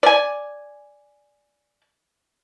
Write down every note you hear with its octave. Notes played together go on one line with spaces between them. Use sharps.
D5 G#5